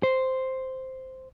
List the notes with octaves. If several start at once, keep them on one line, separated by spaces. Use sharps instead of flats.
C5